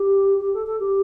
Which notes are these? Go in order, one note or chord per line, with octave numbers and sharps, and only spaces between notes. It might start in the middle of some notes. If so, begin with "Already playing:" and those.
Already playing: G4
G4
A4
A4
G4